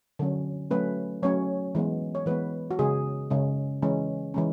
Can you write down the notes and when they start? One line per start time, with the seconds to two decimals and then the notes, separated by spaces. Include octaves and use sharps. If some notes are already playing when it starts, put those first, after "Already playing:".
0.19 D3 F#3 C#4
0.71 F#3 A3 C#4 B4
1.23 F#3 A3 C#4 C#5
1.75 E3 G#3 B3
2.15 C#5
2.26 E3 G#3 B3 B4
2.71 F#4
2.79 C#3 G#3 C#4 G#4
3.30 C#3 G#3 C#4
3.82 E3 G#3 C#4
4.34 E3 G#3 C#4